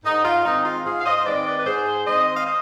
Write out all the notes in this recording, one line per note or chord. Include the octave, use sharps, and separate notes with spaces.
G#2 D#4
F4
D#3 G#3 C4 D#4
F4
G#2 F4 G#4
F5
C5 D#5
D#3 G#3 C4 B4 D5
B4 D5
B4
G#2 G#4 C5
D#3 G#3 C4 C5 D#5
F5
C5 D#5